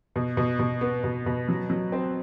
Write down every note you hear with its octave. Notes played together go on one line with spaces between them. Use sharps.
B2
B2
B2
B3
B2
B2
F#3
F#3
C4